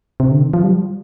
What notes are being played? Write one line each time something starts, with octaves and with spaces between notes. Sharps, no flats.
C3
D3
D#3
F3
G3